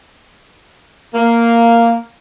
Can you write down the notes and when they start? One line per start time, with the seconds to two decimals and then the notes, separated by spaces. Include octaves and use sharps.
1.14 A#3